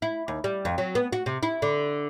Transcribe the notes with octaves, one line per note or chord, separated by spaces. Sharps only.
E4
D#2
G3
F2
F#3
B3
F#4
C3
E4
D3